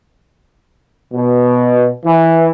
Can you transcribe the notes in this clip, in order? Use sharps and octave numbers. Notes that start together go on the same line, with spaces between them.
B2
E3